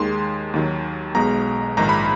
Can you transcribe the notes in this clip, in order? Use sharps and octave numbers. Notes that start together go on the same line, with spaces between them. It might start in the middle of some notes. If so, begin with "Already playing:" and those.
Already playing: D#2 D#3 G#3 C6
D#2 D#3 F#3
B1 B2 G#3 A#5
A#1 G#2 D#3 A#5
B5